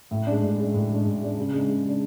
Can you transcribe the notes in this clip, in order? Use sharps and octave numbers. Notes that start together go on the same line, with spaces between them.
A2
G#3 D4
A2
G#3 D4
A2
G#3 D4
A2
G#3 D4
C#3
G#3 D4
C#3
G#3 D4